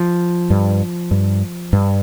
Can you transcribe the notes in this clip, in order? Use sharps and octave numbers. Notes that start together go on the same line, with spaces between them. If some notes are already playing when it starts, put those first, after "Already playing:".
Already playing: F3
G2
G2
G2